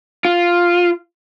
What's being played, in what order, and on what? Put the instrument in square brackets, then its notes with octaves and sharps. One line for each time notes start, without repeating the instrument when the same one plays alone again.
[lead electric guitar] F4